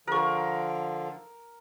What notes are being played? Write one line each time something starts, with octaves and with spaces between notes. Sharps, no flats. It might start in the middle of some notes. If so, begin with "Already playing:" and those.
D3 F3 G#4 A#4 C#6